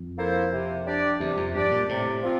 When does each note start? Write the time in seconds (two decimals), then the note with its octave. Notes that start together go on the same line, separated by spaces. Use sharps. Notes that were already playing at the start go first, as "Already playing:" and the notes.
Already playing: F2
0.18 A#3 E4 A4 C5
0.52 C3
0.86 G3 D4 G4 D5
1.20 E2 C3
1.37 F2
1.54 G2 G3 D4 G4 D5
1.71 A#2
1.89 A2 C3
2.23 F3 C4 F4